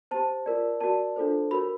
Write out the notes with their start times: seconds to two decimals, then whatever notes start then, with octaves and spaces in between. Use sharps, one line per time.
0.11 G4 C5 A5
0.46 F4 A#4 D5
0.81 F#4 A#4 D5 A5
1.16 D4 F4 A4 C5
1.51 F#4 A#4 C#5 B5